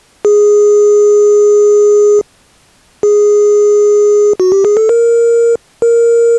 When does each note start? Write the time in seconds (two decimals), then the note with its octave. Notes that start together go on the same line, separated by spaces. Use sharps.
0.25 G#4
3.03 G#4
4.40 F#4
4.52 G4
4.65 G#4
4.77 A4
4.89 A#4
5.82 A#4